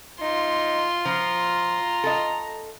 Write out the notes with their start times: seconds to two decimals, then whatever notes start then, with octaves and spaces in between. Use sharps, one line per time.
0.21 D#4 F4 C6
1.06 F3 A#5
2.04 A4 D#5